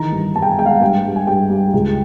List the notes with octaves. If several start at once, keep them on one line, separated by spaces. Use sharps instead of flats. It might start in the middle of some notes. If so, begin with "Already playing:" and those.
Already playing: D#3 E3 A#5
G2
G2 A5
G5
G#5
G#3 G5
F5
F#5
G2 G5
G2
G#5
G2 G5
G3
C#2